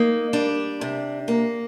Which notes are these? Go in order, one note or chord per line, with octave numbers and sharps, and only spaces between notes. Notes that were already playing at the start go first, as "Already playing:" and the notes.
Already playing: A#3 D#4
G3 D4
C3
A#3